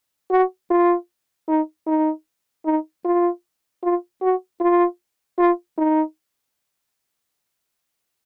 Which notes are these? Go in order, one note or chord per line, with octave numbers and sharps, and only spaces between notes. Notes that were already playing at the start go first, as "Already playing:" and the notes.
F#4
F4
D#4
D#4
D#4
F4
F4
F#4
F4
F4
D#4